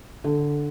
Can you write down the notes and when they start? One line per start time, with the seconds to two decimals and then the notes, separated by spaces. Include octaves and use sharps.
0.24 D3